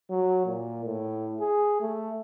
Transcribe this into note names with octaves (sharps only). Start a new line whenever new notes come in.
F#3
A#2
A2
G#4
A3